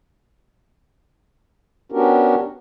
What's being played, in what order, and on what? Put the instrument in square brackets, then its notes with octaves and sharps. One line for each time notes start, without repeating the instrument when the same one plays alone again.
[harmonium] B3 C#4 D4 F#4 G4 A#4